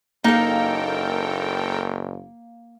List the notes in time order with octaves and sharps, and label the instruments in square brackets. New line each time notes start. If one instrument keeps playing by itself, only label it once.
[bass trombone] F#1 [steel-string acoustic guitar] A#3 F5 [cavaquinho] D#4 [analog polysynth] A4 A#4 G5